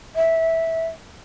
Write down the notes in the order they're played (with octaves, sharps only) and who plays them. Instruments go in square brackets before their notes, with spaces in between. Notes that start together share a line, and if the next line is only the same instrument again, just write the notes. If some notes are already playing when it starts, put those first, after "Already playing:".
[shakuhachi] E5